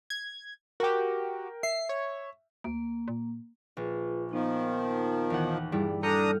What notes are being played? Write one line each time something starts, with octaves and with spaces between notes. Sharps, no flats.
G#6
F#4 G4 A#4 G5
E5 C7
C#5
D2 A#3
A#2
A#1 F4 G#4 B4
D#3 F3 B3 D#4
D#2 E3 F#5
G2 G3 E4 G#4
D4 A4 A#5 D#6 F6 G6 C#7